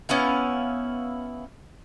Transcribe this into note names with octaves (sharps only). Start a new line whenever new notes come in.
B3 C#4 E4 F5